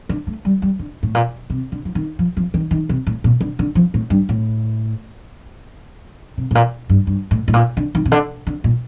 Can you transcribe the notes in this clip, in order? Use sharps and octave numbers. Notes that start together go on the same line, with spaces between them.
D3
A3
G3
G3
D3
A2
A#2
C3
D3
F3
D#3
F3
F3
D#3
D#3
C3
A2
A#2
D3
D3
F3
A2
G2
A2
C3
A2
A#2
G2
G2
A2
A2
A#2
D3
D#3
C3
D3
D3
A#2